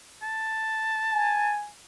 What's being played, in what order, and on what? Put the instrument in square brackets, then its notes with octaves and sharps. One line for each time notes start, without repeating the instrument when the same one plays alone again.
[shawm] A5
[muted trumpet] G#5